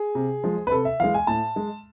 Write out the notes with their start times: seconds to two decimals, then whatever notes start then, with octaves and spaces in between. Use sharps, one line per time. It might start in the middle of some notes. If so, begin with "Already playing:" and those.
Already playing: G#4
0.15 C3
0.44 F3 G#3
0.67 B4
0.72 C3 A4
0.85 E5
1.00 E3 G#3 F5
1.14 G#5
1.27 A2 A5
1.56 G#3